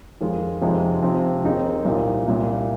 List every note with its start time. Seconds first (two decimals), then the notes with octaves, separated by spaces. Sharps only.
0.21 F2 D#3 G#3 F4
0.62 F2 C3 F3 G#3 D#4
1.02 C3 F3 C4
1.44 D#2 D#3 C4 D#4 G#4
1.85 C2 A#2 A#3
2.26 C2 A#2 A#3